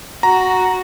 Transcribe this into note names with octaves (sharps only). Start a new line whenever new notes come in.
F#4 A#5